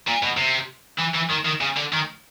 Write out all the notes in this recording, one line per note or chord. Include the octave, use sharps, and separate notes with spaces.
A#2
B2
C3
E3
E3
D#3
D#3
C#3
D3
D#3